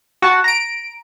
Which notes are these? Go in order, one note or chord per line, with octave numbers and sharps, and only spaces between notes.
F#4 F#5 A5
A#5 D7